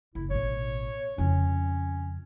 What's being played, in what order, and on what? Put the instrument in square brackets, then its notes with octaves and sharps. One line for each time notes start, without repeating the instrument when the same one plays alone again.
[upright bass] F#1 [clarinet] E4
[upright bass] A1 B2 [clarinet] C#5
[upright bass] F2 C#3 [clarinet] C#4